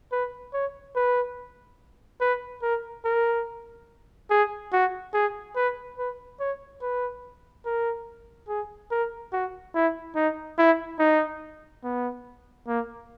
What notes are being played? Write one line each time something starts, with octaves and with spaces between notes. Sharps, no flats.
B4
C#5
B4
B4
A#4
A#4
G#4
F#4
G#4
B4
B4
C#5
B4
A#4
G#4
A#4
F#4
E4
D#4
E4
D#4
B3
A#3